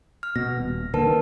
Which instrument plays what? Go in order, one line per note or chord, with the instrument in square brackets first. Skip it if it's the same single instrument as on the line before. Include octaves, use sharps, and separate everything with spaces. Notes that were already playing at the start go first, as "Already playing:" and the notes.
[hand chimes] F6
[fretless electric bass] B2 [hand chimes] A#6
[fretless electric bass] D#1
[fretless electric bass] D#2 D3 [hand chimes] A#4 B4 A5
[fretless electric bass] D#2 D#3